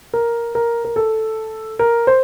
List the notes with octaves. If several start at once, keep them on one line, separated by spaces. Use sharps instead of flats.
A#4
A#4
A#4
A4
A#4
C5